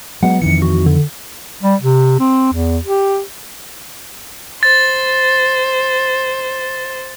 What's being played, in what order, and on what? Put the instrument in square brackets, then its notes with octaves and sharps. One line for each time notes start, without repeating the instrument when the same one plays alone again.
[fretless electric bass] F#3 G#3 B3 [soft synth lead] F#5
[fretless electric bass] F2 D#3 E3 [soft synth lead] C#7
[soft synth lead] F#4
D3
[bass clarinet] G3
C3
C4
E2
G4
[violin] C5 [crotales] A6